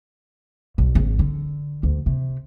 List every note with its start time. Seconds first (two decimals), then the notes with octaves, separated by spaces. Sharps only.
0.78 B1
0.95 D1 G#1
1.19 D3
1.83 D2
2.06 C3